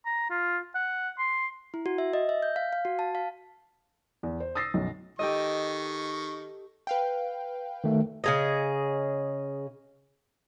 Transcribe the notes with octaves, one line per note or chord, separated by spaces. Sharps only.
A#5
F4
F#5
C6
E4
F#4
E5
D#5
E5
G6
F5
F5
F#4
A5
F5
E2
C5
D#6 E6 A6 A#6 C7
B1 F#2
D#3 G4 A4 D#5 C#6
B4 F5 G5
D#3 A3
C#3 G#4 D#5